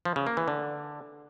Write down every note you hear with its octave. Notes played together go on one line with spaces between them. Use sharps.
F3
C#3
A#3
E3
D3